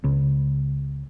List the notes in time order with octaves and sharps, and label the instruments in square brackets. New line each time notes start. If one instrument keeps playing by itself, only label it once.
[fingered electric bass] C#2